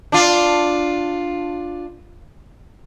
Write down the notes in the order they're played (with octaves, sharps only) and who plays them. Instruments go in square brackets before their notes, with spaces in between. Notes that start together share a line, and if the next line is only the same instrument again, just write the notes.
[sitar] D4 F4